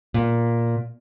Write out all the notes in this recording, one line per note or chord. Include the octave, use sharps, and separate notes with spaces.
A#2